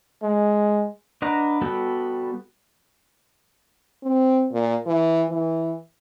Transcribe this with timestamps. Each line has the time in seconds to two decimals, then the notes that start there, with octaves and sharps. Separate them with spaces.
0.23 G#3
1.22 D4 B4 D#5 F#5 A#5
1.61 G3 B3 F#4 G4 A4
4.03 C4
4.52 A#2
4.86 E3
5.30 E3